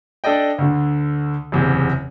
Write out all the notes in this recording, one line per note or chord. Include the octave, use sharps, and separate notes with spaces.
D4 A4 D5 D#5 G5
D2 D3
F#1 E2 C3